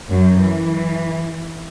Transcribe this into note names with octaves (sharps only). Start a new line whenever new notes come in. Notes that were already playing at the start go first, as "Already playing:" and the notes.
F#2 F#3
E3